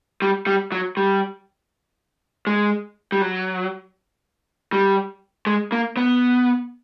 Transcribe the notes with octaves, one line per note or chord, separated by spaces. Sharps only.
G3
G3
F#3
G3
G#3
G3
F#3
G3
G#3
A#3
B3